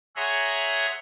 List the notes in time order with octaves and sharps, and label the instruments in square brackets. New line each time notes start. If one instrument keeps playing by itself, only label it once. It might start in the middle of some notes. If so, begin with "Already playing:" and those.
[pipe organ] G#4 C#5 E5 F#5 A#5 C6